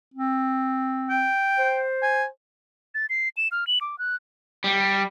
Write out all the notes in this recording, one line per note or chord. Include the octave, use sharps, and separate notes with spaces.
C4
G5
C5
G#5
A6
C7
E7
F6
F#7
D6
F#6
G3